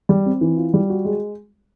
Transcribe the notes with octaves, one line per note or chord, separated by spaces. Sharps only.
G3
C4
E3
F4
G3
F#4
G#3